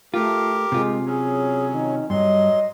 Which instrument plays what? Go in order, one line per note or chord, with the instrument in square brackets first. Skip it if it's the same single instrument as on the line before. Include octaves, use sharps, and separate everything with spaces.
[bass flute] A3 [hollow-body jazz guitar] F4 [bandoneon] G4 A#4
[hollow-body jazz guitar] C3 F4 [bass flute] G#3
[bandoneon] F#3 C#4 [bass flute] G#4
[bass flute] D#3
[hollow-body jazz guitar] G2 [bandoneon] F#3 C6 [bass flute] D#5